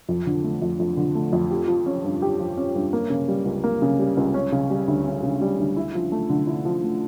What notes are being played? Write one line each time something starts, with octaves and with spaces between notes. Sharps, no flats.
F2
D3
A3
F2
F2
D3
A3
F2
G4
F3
C#4
G2
G4
F3
C#4
G2
A#3
C#3
G3
C#2
A#3
C#3
G3
C#2
C#4
C#3
G3
D2
C#4
C#3
G3
D2
E4
F3
A3
D3
E4
F3
A3